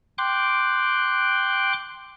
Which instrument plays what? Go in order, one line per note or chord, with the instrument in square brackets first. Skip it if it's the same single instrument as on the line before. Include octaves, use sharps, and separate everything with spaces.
[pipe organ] G5 C6 D6 F#6